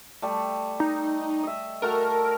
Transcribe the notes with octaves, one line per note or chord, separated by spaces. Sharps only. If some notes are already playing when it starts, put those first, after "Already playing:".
G3 A3
D#4
D#5 E5
A3 F#4 A4 A#4